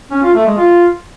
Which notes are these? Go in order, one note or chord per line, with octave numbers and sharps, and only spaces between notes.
C#4
F4
A3
G#3
F4